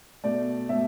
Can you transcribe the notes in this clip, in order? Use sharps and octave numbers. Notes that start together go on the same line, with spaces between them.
B2 A3 D5
B2 A3 E5